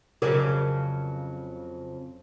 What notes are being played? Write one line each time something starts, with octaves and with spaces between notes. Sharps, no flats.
F2 C#3 F#3 G#4 A#4 D5